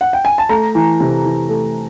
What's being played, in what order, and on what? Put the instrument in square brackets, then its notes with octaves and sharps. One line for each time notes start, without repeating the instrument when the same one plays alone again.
[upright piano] F#5
G5
G#5
A5
A3 A#5
E3
C3
E3
A3